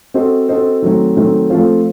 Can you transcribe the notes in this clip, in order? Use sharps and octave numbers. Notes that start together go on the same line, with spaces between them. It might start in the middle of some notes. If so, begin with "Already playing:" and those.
C4 F#4 A4 C5 D#5
C4 F#4 A4 C5 D#5
D#3 F#3 A3 C4
D#3 F#3 A3 C4
F3 A3 C4 F4 C5